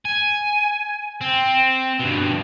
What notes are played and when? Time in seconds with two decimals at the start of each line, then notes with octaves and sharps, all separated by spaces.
0.05 G#5
1.21 C4
2.00 G2 B2